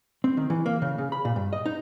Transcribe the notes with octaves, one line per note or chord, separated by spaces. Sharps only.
C4
D#3
E3
A#3
C#3
C#3
B5
A#2
G2
D#5
D#4